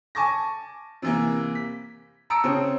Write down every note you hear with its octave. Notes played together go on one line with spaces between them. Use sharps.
G#5 A5 C#6 D6 A#6
C3 E3 A#3
B6
A5 A#5 D#6 E6 C#7 D7
C#3 C4